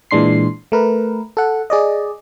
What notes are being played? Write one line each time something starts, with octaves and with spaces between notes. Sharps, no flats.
A#2 E3 G#3 D4 C6 C7
A3 A#4 B4
A4 F#5
G#4 D5 D#5